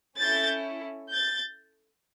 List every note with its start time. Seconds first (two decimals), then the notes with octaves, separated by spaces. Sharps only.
0.20 C#4 E4 A4 G6 A6
1.10 G6 A6